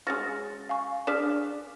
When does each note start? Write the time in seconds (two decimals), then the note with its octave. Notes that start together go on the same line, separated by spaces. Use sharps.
0.07 G#3 C#4 F#4 F6 A6 A#6
0.69 F5 G#5 C#6
1.07 D4 G#4 D5 F6 B6 E7